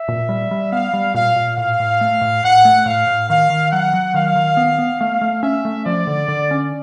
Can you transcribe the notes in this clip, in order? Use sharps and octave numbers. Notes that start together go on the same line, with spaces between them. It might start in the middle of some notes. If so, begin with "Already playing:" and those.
Already playing: E5
A#2
G3
G3
B3 F5
G3
A#2 F5
A#2
A2 F5
A2
A3
A2
A2 F#5
A3
A2 F5
A2
D#3 F5
D#3
F#3 F#5
F#3
D#3 F5
D#3
B3
B3
A3 F5
A3
C#4 E5
A3
F3 D5
D3
D3
C#4